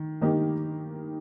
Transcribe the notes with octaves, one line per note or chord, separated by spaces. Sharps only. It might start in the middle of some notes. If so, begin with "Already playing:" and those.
Already playing: D#3
D#3 A#3 D#4 G4